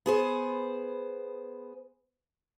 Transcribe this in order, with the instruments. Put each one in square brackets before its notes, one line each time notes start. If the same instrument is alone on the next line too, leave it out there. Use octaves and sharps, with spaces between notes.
[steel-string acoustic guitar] B3 G#4 C5